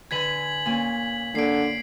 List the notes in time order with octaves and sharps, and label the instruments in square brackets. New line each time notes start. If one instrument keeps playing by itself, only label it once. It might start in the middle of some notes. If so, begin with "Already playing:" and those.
[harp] D3 B4 G#5 [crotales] G#6 B6 F#7
[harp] A#2 A#3 C#4
[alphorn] D3 [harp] A#3 [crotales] C7 D7